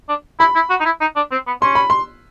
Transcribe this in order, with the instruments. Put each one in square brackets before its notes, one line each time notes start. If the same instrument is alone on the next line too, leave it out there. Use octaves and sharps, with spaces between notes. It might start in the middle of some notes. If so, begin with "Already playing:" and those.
[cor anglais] D4
[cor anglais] E4 [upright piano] B5
[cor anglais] E4
F#4
D#4
E4
D#4
D4
C4
B3
[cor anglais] C#4 [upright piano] C6
[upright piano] B5
C6